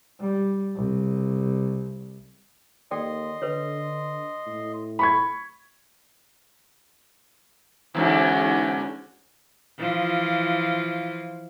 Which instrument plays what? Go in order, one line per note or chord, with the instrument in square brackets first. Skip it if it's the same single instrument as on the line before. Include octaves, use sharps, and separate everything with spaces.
[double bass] G3
C2
[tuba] D#2 [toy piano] A4 D5 G5 [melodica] D#5 C6
[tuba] D3 [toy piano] A4 B4 C#5
[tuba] A2
[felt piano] B5 C#6 G#6
[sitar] E2 G#2 D3 [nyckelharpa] C#4 F#4
[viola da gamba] E3 F3 F4